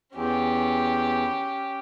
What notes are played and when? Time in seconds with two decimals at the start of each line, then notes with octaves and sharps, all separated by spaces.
0.15 E2 C#4 G4